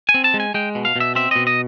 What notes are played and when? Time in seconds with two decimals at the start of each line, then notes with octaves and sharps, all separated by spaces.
0.09 G#5
0.14 C4
0.24 A5
0.34 G#3
0.40 G#5
0.54 G#3 G5
0.75 B2
0.85 F5
0.96 B2 E5
1.15 C4 E5
1.31 B2 D#5
1.47 D#5